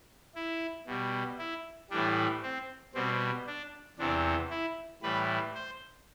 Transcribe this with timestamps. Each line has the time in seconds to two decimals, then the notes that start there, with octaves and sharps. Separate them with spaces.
0.35 E4
0.87 B2 G3
1.38 E4
1.90 A2 E3 G3 D4
2.43 C4
2.94 B2 G3 C4
3.47 D4
3.98 E2 C3 E3 D4
4.50 E4
5.02 A2 E3 G3 B4
5.55 C5